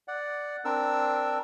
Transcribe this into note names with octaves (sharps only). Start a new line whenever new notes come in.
D5 F#5
C4 D4 A#4 E6